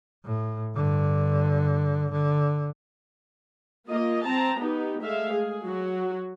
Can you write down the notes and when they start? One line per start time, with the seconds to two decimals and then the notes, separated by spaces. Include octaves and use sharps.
0.25 A2
0.75 G2 D3
2.12 D3
3.87 A#3 F4 D#5
4.24 C4 A5 A#5
4.60 B3 D#4 G4
5.00 G#3 A3 E5 F5
5.31 G#4
5.63 F#3 F#4